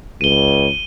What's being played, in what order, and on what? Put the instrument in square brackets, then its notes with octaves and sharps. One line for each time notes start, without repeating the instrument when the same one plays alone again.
[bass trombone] C#2 [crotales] D#7 G7